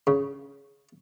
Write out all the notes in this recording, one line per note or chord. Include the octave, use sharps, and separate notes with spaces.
C#3